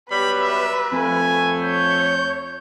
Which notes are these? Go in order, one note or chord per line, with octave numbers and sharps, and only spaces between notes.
B2 F#3 G3 B4 B5
E5
F2 A3 G#5
C#5 G6